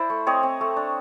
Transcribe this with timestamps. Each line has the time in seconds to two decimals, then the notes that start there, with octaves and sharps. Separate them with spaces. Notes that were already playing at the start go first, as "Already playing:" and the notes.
Already playing: E4 C5 D5
0.10 A3
0.27 C4 C#5 D#5
0.43 C4
0.61 A3
0.77 D4